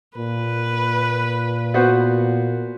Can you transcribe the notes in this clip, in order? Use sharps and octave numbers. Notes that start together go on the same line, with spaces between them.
A#2 B4
B3 F#4 C5